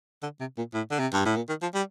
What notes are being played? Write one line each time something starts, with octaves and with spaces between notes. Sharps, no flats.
D3
C3
A#2
A2
D3
C3
G2
A2
A#2
D#3
F3
G3